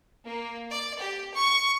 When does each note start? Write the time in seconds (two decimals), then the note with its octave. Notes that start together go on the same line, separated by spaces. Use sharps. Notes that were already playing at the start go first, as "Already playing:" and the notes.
0.25 A#3
0.70 D5
0.99 G4
1.35 C#6